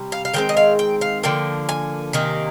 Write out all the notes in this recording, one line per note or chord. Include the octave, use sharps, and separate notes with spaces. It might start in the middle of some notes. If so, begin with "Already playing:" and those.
Already playing: C3 G3
F5
F5
D#3 G#3 C4 G5
D#5
F5
G5
F5
D3 F3 A#3 G5
G#5
C3 D#3 A#3